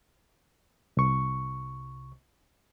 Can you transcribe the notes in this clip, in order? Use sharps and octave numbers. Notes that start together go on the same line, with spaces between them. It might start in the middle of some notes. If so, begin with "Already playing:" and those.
C2 C#6